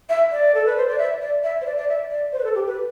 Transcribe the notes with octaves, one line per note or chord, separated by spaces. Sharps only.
E5
D5
A4
B4
C5
D5
E5
D5
E5
C5
D5
D5
E5
D5
C5
B4
A4
G4
B4